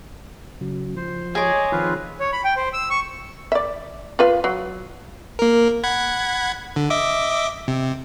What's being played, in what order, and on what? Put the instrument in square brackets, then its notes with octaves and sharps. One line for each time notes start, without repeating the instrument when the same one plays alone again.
[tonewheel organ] C#3 F#3
[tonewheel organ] F3 [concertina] C5
[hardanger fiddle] G#3 C#5 [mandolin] G#4 D6 [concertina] D#5
[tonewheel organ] D#3 F3 [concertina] C4 F4 B4
[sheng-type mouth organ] C#5
B5
G5
C5
E6
C#6
[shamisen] D5 E5
F4 B4 F5
F#3
[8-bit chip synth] A#3 A#4
F#5 B5 G#6
D3
D#5 E5 D6
C3